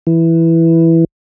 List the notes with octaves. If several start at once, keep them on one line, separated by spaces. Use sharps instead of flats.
E3